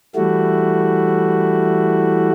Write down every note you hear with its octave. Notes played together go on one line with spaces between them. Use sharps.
E3 G3 A3 E4 F#4